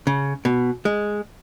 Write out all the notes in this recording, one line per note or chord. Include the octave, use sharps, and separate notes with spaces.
C#3
B2
G#3